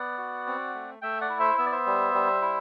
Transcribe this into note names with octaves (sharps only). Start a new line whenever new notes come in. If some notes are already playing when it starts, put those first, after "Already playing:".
Already playing: B3 D5 F#5
F#4
C4
A3
A3 E5 G5
D5 F#5
E4
C5 E5
B3 E5
D5
C5 E5
G3
G3
E4